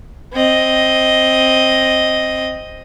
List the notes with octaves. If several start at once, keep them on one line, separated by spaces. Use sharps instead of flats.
C4 D#5